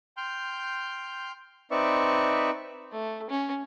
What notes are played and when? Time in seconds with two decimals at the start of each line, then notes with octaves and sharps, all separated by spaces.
0.17 G5 C6 F6 G6
1.71 C4 D#4 B4 D5 E5 C#6
2.92 A3
3.30 C#4